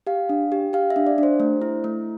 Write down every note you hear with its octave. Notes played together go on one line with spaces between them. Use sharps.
G4 F5
D4
G4
G4 F5
E5
D4
D5
D4 C5
A3
E4
A3